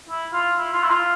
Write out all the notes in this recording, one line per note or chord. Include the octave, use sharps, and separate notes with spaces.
E4
F4
E4
F4
E4
F4